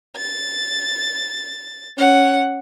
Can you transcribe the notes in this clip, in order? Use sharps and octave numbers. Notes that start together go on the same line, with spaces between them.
A6
C#4 F#5